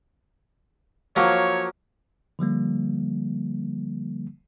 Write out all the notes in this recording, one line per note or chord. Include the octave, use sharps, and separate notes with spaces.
F3 F#3 A#3 C#5
D3 F3 G3 A#3